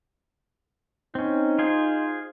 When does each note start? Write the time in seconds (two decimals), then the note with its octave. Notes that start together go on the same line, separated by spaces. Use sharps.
1.15 C4 C#4 D#4
1.59 F4 G#4 C5